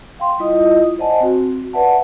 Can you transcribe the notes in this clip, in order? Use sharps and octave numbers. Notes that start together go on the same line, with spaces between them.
F5 G5 C6
G3 E4 F4 D#5 D#6
C5 D5 D#5 F#5 G#5 A5
C4 F#4
B4 D5 E5 F#5 A5